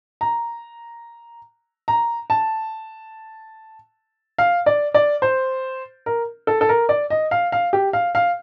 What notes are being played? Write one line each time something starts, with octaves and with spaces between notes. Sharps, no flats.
A#5
A#5
A5
F5
D5
D5
C5
A#4
A4
A4
A#4
D5
D#5
F5
F5
G4
F5
F5